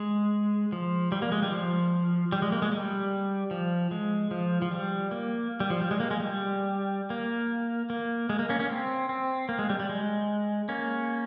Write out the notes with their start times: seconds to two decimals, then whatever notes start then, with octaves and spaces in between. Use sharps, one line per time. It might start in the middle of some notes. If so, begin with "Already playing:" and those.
Already playing: G#3
0.72 F3
1.12 G3
1.22 A#3
1.32 G#3
1.42 G3
1.52 F3
2.32 G3
2.42 G#3
2.52 A#3
2.62 G#3
2.72 G3
3.51 F3
3.91 G#3
4.31 F3
4.62 F3
4.71 G3
5.11 A#3
5.60 G3
5.70 F3
5.81 G3
5.91 G#3
6.00 A#3
6.11 G#3
6.20 G3
7.10 A#3
7.90 A#3
8.30 G#3
8.39 A#3
8.49 A#3 C#4
8.60 A#3 C#4
8.70 C4
9.09 C4
9.49 A#3
9.59 G#3
9.70 G3
9.80 G3
9.89 G#3
10.69 A#3 C#4